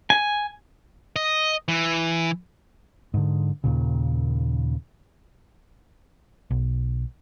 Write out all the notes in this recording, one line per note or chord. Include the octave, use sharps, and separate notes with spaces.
G#5
D#5
E3
G#2 D3
D#2 A#2 C#3
B1